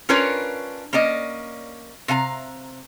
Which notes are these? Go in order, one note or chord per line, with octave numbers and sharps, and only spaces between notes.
C#4 D4 F4 A#4 B4 C#5
A#3 C#4 D5 D#5
C3 F5 G#5 A#5